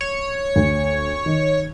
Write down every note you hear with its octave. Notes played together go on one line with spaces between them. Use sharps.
C#5
D2
D#3